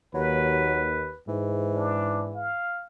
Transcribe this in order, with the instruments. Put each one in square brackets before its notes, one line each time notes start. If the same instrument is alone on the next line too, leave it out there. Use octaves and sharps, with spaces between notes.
[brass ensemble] D#2 [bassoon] F#3 [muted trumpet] B4
[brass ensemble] G#2 [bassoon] E3
[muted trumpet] D4
F5